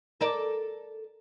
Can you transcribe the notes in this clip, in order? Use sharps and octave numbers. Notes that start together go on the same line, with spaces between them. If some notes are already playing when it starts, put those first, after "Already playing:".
A4 A#4 D5